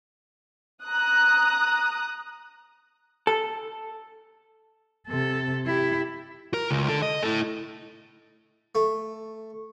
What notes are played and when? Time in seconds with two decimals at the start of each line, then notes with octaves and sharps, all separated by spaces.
0.84 A#5 D#6 F#6
3.27 A4
5.08 C3 A4
5.66 E4 G4
6.54 A#4
6.71 C#2
6.89 D3 A4
7.02 D#5
7.23 E4 A4
8.75 A3